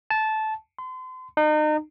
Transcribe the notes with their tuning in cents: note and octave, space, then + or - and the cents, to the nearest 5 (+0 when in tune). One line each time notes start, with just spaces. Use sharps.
A5 -15
C6 -35
D#4 -35